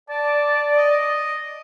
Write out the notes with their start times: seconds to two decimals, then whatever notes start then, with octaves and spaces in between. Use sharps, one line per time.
0.10 D5 A5
0.77 D#5